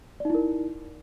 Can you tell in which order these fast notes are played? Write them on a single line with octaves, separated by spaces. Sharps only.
D5 D#4 E4 A#4